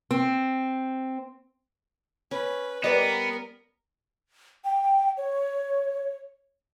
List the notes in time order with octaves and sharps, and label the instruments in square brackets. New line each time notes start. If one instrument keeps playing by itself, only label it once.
[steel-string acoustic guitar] C4
[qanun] C#4 [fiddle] B4
[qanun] G3 [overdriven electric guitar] B3 [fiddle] A#4 [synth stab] B4 D5 D#5
[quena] G5
C#5